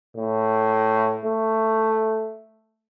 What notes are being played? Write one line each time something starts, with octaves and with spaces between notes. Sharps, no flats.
A2
A3